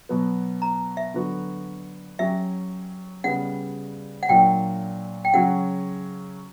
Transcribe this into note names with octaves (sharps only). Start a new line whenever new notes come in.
B2 F#3 B3
A#5
E5
D3 F#3 B3 F#4
F#3 C#4 G4 E5
C#3 G3 B3 F#5
F#5
A#2 F#3 A#3 D4 G5
G5
C#3 F#3 C#4 F#4 F#5